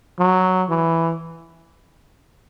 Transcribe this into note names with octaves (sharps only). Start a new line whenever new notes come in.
F#3
E3